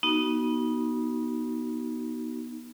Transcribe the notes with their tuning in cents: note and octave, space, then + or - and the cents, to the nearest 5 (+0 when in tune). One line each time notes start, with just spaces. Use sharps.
B3 -30 D#4 +0 F#4 +25